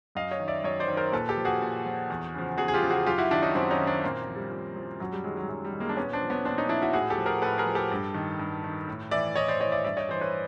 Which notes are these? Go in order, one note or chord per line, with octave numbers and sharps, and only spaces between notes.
F#2 D#5 F5
C#5 D#5
D#3
D5 E5
F#2 C#5 D#5
C5 D5
D#3
A#4 C5
A#2 A4 B4
G4 A4
F3
F#4 G#4
A#2
F3
E2
C#3 F3
E2 F#4 G#4
G#4
F4 G4
C#3 F3
F#4 G#4
F#2 F4 G4
E4 F#4
D#3 D4 E4
C#4 D#4
F#2 C4 D4
C#4 D#4
D#3
C4 D4
A#2 A#3 C4
F3
G3
A#2
F3
F#2 F#3
G3
D#3 F#3 G#3
F#3
F#2 F#3
G3
D#3
G#3 A#3
D4
A#2 B3 C#4
C4 D4
F3
B3 C#4
A#2 C4 D4
C#4 D#4
F3 D4 E4
E4 F#4
A2 F#4 G#4
G4 A4
F3
G#4 A#4
A2 A4 B4
G#4 A#4
F3
G4 A4
G2
D#3
G2
D#3
A2
E3 D5 E5
A2 C#5 D#5
C5 D5
E3 C#5 D#5
D5 E5
G2 D5 E5
C#5 D#5
E3 C5
B4 C#5